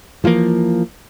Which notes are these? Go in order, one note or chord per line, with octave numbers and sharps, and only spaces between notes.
E3 F3 G#3 A#3